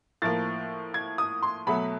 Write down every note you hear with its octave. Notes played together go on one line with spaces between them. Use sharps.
A2 F3 A#3 A6
G#6
D#6
C6
B2 F#3 A3 B5